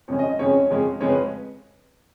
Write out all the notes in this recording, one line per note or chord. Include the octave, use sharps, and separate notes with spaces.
F2 C#3 G#3 C#4 C#5
D#5
D#5
F2 C#3 G#3 C#4 C#5
F2 C#3 G#3 C#4
F2 C#3 G#3 C#4 C#5
B4